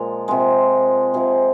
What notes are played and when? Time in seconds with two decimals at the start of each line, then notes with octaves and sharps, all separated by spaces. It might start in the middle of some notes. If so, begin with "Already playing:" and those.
Already playing: A#2 F3 G#3 A#4
0.28 C3 F3 G#3
1.14 C3 F3 G#3 G#4